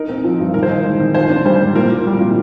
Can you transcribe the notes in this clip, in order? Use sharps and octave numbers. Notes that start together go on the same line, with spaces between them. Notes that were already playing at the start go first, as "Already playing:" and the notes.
Already playing: D#4 A#4
C4
F3
G2
D#3 A#4
C5
D#4 A#4
G#3
D#3
F4 C5
D4
G3 C5
G#2
A#2 A#4
A#3
G3
A#2